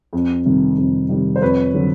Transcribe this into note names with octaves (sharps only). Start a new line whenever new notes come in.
F2
C3 D#3 G3
F2
C3 D#3 G3
C5
F2 B4 C#5
D3 F#3 A3